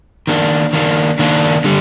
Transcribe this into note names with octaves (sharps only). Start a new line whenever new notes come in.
D#3 A#3 D4
D#3 A#3 D4
D#3 A#3 D4
D3 G3